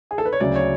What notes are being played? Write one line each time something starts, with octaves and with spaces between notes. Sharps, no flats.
G#4
A4
B4
C#5
D2 C#3 F#3 D5
C#5